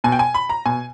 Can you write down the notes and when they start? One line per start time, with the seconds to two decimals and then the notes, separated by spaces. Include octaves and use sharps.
0.04 B2 G#5
0.12 G5
0.19 G#5
0.34 B5
0.50 A#5
0.66 B2 G#5